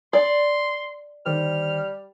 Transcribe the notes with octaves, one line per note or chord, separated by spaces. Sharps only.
D5 C6
D3 D#3 G3 C5 F6